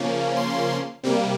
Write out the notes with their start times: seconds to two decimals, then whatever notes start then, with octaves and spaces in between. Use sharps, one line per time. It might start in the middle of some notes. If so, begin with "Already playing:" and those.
Already playing: C#3 F3 A#3 C#4
0.37 C6
1.03 C3 G3 A#3